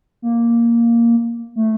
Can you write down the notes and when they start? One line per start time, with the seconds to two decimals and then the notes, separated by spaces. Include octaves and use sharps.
0.22 A#3
1.56 A3